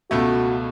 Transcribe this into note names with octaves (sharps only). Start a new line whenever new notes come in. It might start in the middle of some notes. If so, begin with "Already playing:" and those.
C#2 B2 A3 F#4